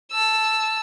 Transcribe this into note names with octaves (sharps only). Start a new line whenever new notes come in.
A5 E6